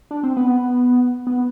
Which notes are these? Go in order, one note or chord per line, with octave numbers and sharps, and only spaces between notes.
D4
C4
B3
B3